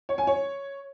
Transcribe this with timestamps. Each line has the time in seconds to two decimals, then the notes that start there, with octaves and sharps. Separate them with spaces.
0.09 C#5
0.18 G#5
0.27 C#5